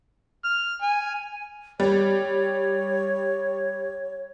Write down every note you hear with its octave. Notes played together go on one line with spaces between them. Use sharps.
F6
G#5
G3 C#5